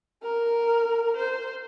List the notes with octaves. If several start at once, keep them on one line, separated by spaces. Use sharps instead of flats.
A#4
C5